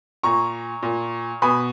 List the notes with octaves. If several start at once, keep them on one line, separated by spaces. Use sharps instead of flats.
A#2 A#5 C#6
A#2
B2 G#5 B5